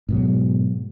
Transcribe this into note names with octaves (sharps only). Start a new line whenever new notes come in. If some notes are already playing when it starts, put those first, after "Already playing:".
G#2 B2 F#3